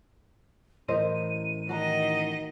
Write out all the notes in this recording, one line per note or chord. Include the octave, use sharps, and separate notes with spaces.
A2 E3 A#4 C5 D#5 D#7
D#3 F#4 D#5 A#5